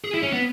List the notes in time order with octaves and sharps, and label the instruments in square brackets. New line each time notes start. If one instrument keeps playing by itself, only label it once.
[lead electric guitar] G#4
E4
C#4
B3